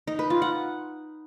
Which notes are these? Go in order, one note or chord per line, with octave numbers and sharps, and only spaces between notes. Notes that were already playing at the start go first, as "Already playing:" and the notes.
D#4
B4
F4
F#5